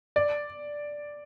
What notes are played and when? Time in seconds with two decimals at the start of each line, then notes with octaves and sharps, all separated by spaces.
0.16 D5